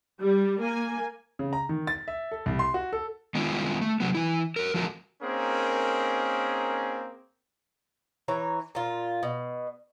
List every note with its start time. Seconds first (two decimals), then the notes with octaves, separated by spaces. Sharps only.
0.22 G3
0.61 A#3 G#5
1.39 C#3
1.53 A#5
1.69 D#3
1.87 A6
2.08 E5
2.31 A4
2.46 C2
2.59 C6
2.74 F#4
2.93 A4
3.35 D#3 G#3 B3 C#4 E4 F4
3.81 A3
4.00 C3 F#3 B3
4.15 E3 E4
4.56 A#4 C#5
4.74 F3 A3 F#4 A#4
5.22 A#3 C4 C#4 D#4 G#4 A#4
8.28 E3 C#5 A#5
8.75 A#2 F4
9.23 B2